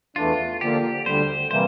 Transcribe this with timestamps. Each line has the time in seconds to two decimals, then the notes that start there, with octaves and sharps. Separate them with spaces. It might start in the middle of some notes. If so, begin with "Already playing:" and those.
0.16 E2 E3 A3 D4 F4
0.61 D3 F3 A#3 G4
1.06 D2 D3 G3 C5
1.51 C3 E3 G3 A#3 C5